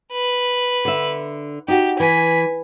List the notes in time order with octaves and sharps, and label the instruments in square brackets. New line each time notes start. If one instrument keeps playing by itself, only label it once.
[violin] B4
[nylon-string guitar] D3 E5
[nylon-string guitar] D#4 F#4 [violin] G4
[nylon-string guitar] E3 [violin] G#5 B6